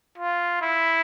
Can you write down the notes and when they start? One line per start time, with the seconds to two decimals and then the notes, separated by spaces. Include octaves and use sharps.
0.18 F4
0.61 E4